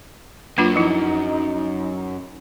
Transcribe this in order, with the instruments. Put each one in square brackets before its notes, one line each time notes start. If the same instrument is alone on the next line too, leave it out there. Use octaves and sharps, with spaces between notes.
[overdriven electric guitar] F#2 [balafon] A#3 D4 F4 [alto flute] B4
[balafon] F3 E4 [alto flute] D#4